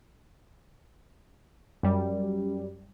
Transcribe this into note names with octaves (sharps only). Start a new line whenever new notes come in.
F#2 G3